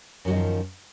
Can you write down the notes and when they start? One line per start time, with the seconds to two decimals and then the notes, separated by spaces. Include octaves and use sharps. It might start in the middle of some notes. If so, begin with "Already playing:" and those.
0.25 F#2
0.28 F#3
0.30 D#3
0.33 D3
0.36 F3